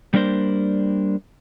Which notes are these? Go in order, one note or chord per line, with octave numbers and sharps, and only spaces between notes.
G3 A#3 D4 A#4 C5